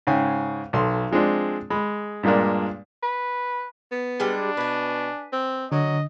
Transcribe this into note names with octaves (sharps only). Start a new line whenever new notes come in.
G#2 C#3 G5 G#5
B1 A4 C6
F3 G#3 C4 D4
G#3 B5
G2 A#2 G#3 A#3 D4
B4
B3
G3 G#3 D4 G#4
B2 B4 G#5
C4
D3 F#3 D#5